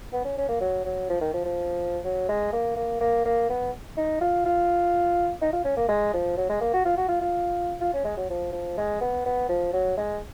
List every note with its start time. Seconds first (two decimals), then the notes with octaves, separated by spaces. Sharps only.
0.12 B3
0.25 C#4
0.37 C#4
0.48 A#3
0.60 F#3
0.84 F#3
1.09 F3
1.21 D#3
1.33 F3
1.45 F3
2.04 F#3
2.29 G#3
2.53 A#3
2.76 A#3
3.00 A#3
3.25 A#3
3.49 B3
3.97 D#4
4.21 F4
4.45 F4
5.41 D#4
5.53 F4
5.64 C#4
5.77 A#3
5.88 G#3
6.13 F3
6.37 F#3
6.49 G#3
6.61 A#3
6.73 F#4
6.85 F4
6.97 F#4
7.08 F4
7.21 F4
7.81 F4
7.93 C#4
8.05 G#3
8.17 F#3
8.29 F3
8.52 F3
8.77 G#3
9.01 B3
9.25 B3
9.49 F3
9.73 F#3
9.97 G#3